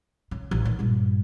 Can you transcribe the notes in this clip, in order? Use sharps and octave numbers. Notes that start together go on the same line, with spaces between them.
C#3
A1
D#3
G2 A#2